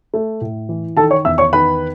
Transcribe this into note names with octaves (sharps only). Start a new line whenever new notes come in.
A3
A2
E3
D#3 A4 A5
C#5 C#6
E2 E5 E6
C#5 C#6
D#3 B4 B5